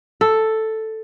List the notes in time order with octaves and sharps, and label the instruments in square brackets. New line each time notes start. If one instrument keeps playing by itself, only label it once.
[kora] A4